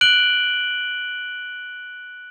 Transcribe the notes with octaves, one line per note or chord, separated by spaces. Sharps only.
F#6 D7 F#7 G7